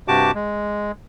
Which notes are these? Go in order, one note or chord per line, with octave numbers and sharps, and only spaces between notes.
G2 C3 F#4 G4 A5 D6
G#3